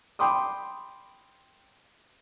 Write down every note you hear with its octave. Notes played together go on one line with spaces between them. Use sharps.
G5 B5 C6 D6 D#6